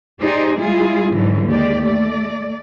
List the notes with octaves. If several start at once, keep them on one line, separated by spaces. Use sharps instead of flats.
D#4 G4 G#4 C5 D5
G3 G#3 E4 F4 G#4
G#2 D3 E3 F#3 G3
D#2 G#3 G4 D5
A3 D5